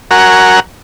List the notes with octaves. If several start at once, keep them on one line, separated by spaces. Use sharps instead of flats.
F#4 A#4 F#5 G#5 A#5 C#6